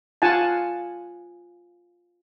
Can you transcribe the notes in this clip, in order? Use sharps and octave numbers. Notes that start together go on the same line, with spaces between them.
F4 F#5 G#5 A5